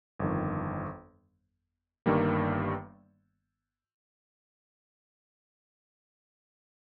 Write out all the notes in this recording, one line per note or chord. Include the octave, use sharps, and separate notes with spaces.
G1 F2 D#3
G1 G2 D#3 G3 A#3